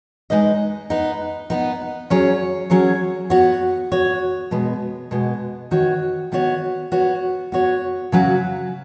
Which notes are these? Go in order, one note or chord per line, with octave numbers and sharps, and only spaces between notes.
G#3 D#4 B4 D#5
B3 D#4 B4
B3 D#4 B4
F#3 C#4 G#4 C#5
F#3 C#4 G#4 C#5
B3 F#4 C#5
B3 F#4 C#5
B2 G#3 B3
B2 G#3 B3
D#3 B3 F#4 C#5
D#3 B3 F#4 C#5
B3 F#4 C#5
B3 F#4 C#5
C#3 F#3 C#4 F#4 B4